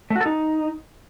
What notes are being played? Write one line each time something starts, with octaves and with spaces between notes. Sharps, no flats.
A3
F#4
A4
D#4